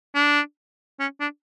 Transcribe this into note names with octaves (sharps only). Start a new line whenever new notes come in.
D4
C#4
D4